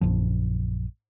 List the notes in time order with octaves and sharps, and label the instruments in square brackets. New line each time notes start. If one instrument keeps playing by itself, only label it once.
[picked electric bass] A#1 F#2 F3